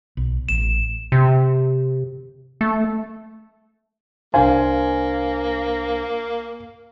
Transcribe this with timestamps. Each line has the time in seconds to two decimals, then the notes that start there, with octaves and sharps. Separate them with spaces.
0.17 B1
0.49 A1 E7
1.12 C3
2.61 A3
4.34 C2 A#3 D4 C5 F5 G#5